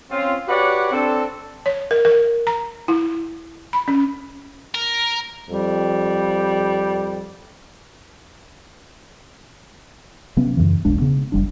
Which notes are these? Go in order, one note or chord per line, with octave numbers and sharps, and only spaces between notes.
C4 C#4 F4
F#4 G4 B4 C#5 D5 F#5
C4 D4 A4
C#5
A#4
A#4
A#5
E4
B5
C#4
A#4
F2 G3
C3 F#3 B3 C#4
F#2 A#2 C#3 E3
E1 B1 G#3 D4
C#3 B3
F1 G3 D4